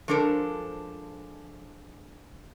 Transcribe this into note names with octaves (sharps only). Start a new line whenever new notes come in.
F3 G#3 D4 A4 A#4 C5